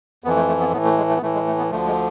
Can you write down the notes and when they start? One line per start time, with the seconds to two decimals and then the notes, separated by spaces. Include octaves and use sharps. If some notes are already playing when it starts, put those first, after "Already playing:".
0.24 F2 B3
0.27 E3
0.36 A3
0.48 A3
0.60 B3
0.73 A2 B3
0.77 E3
0.84 A3
0.98 G#3
1.09 A3
1.17 B3
1.22 A2 E3 A3
1.35 G#3
1.47 A3
1.58 B3
1.70 D2 D3 F3 A3
1.87 G#3